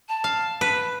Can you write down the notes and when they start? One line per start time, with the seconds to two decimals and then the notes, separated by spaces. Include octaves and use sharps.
0.09 A5
0.24 F5
0.61 B4